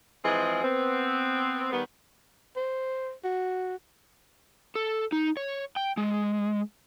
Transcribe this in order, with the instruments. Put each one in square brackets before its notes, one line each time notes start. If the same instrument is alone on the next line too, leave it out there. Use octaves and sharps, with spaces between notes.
[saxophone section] E3 F3 G#3 C4 G#4
B3 C4
D#3 G3 B3
[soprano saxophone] C5
F#4
[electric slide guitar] A4
D#4
C#5
G5
G#3